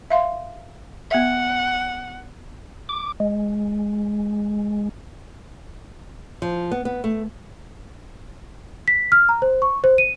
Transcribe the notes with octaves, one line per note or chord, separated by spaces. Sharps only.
E5 F5 C6
B3 E5 F#5
D6
G#3
F3
B3
B3
A3
B6
F6
A#5
C5
C#6
C5
D#7